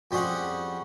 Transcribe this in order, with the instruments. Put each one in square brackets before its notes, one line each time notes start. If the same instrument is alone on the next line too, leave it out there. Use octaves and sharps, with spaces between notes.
[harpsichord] F2 G3 C#4 G#4 F#5